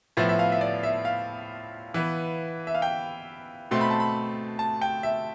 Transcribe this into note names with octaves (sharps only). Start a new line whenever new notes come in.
A2 F3 B3 E5
E5
F5
E5
D5
E5
F5
E3 B3
E5
F5
G5
B2 A3 C4 C6
B5
A5
B5
A5
G5
E5